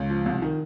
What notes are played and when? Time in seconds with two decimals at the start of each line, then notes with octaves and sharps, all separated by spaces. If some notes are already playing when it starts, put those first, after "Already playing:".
Already playing: C#2
0.09 F3
0.26 C2
0.42 D#3